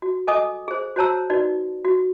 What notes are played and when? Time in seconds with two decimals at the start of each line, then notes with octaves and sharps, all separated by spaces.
0.02 F#4
0.27 A4 D#5 G#5 D6 D#6
0.68 G#4 C5
0.96 F#4 C5 C#5 A5 A#5 E6
1.30 D#4 F#4 B4 D5
1.85 F#4